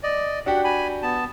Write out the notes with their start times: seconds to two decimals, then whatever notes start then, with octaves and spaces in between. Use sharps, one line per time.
0.03 D5 D#5
0.46 D4 F#4 G4 F#5
0.64 G#5 B5
1.02 B3 A5